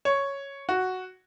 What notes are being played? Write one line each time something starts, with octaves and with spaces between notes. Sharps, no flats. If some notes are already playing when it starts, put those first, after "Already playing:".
C#5
F#4